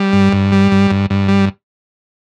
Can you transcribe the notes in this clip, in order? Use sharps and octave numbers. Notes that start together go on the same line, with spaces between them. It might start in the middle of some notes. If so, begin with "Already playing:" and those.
Already playing: G3
G2
G2
G3
G2
G2
G2
G3